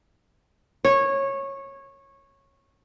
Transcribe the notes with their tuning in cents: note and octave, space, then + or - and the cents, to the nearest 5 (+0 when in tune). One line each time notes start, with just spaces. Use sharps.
C#5 -15